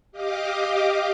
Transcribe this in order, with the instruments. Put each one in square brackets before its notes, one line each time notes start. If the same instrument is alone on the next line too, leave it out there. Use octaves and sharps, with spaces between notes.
[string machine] G4 D#5 F5 D6